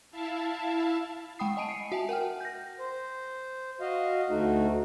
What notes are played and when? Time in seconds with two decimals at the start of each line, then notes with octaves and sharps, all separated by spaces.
0.11 E4 E5 F5 A5
1.39 G#3 F#5 G5 B5 D#6 C7
1.57 D#5 G#5 A5 D7 D#7
1.69 C7 C#7
1.92 F#4 E5 G#5 A5
2.09 A#4 F#5 G5 F6
2.41 G6 A#6
2.80 C5
3.81 F#4 D#5 F5
4.30 D2 A3 D#4 F#4